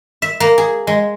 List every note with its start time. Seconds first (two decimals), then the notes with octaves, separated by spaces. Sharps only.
0.22 E5
0.40 A#3
0.58 G#4
0.87 G#3